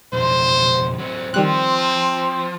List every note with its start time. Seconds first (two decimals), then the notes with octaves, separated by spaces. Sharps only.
0.13 B1 F2 C5
0.99 F#3 C4
1.34 D#3 F3 G3 C4 F#6